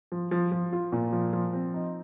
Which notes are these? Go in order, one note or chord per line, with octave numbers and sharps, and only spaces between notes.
F3
F3
F3
F4
A#2
F3
F3
C4
D#4